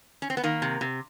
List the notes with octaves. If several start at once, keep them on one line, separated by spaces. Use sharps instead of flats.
C#4
C4
B3
D#3 A#3
C3
C3